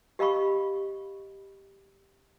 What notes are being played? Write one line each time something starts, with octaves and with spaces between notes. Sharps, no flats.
G4 D#5 F5 B5 C#6